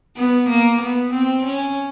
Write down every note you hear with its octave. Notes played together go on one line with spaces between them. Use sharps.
B3
A#3
B3
C4
C#4